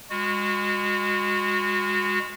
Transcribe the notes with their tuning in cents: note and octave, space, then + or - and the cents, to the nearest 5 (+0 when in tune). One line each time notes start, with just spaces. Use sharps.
G#3 -30 F#4 -20